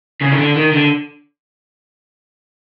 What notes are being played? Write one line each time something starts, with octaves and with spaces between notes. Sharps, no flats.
C#3
D#3
D3
D#3
D3